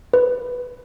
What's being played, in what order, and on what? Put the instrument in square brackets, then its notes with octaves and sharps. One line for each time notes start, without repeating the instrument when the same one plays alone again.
[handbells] B4